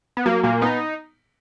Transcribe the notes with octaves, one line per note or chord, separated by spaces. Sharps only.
B3
F#3 A#3
A#2 A#3
B3 D#4